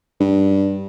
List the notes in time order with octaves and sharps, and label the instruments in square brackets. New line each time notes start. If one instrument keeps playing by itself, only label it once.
[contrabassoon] G2